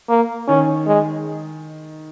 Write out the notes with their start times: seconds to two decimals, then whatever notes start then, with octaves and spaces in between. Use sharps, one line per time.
0.09 A#3
0.48 D#3 C#4
0.87 G#3